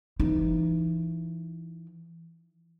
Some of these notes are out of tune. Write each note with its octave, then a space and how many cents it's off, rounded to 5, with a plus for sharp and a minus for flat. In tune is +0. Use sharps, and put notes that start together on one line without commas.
E3 +20 D#4 +0